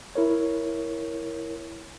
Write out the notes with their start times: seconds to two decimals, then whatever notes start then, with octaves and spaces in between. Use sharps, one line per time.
0.15 E4 A#4 C#5